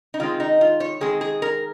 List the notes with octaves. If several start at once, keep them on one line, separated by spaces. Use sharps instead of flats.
D#4
D#3 G#3 C4 F4
D#4
F4
C#5
D#3 G#3 C4 G#4
G#4
A#4